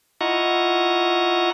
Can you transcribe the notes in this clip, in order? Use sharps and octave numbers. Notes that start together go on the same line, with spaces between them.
E4 F4 D#5 F#5 A#5 C#6